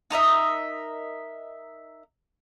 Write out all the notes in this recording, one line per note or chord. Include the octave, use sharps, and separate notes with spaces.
D#4 A#4 D#5 E5